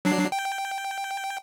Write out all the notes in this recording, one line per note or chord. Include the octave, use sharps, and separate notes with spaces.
F#3 D4 C7
G5